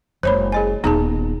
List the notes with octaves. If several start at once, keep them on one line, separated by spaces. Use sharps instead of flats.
F#1 G#3 C5 C#5 B5
G#4 D#5 G#5
D#1 B3 D#4 G#4 A5